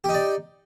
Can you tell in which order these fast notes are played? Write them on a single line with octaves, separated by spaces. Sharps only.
G4 D#4 D5